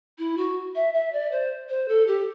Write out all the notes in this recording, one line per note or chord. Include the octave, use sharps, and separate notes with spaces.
E4
F#4
E5
E5
D5
C5
C5
A4
G4